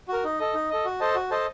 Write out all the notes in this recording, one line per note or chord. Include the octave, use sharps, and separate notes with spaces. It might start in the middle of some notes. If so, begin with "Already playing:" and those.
F#4 A#4
D#4
A4 D#5
D#4
A4 D#5
F#4
A4 C5 D#5 A5
F#4
A4 C5 D#5 A5